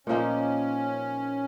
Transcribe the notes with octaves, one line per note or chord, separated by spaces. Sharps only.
A#2 F3 A#3 C#4 D#4